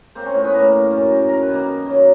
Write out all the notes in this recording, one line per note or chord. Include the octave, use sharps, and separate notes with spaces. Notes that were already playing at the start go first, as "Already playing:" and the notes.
A#3 C4 C5
C#4 C#5
A2
B3 B4
A2 A#3 A#4
A#3
F#2
F#2
D#3 A#4
B4
D#3
A#3 A#4
B2
F#3